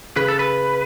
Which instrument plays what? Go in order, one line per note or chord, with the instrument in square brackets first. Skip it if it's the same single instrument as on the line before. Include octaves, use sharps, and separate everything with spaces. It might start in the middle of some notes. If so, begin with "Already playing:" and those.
[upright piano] C#3 [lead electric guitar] B4
[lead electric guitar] A4
B4